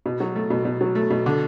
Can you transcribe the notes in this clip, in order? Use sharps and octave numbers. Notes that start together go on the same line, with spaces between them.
B2
F#3
A3
B2
B2
F#3
A3
B2
D3